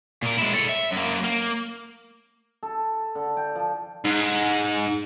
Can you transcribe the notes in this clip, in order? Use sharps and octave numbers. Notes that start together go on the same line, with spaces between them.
A#2 A#4
G#3 E4
A4 C#5
E5
F#2 A#3
A#3
A4
D3
G5
F3
G#2